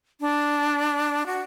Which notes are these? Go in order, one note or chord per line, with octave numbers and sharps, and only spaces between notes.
D4
F#4